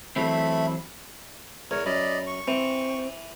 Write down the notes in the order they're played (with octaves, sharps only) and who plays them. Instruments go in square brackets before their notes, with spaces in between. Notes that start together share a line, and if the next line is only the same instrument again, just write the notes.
[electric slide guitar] E3 F#3 C4 [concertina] A3 E5 B5
[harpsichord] E2 [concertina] A#4 C#5
[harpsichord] F#2 [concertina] D5 D#5 B5
[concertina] C#6
[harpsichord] E3 [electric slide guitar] C4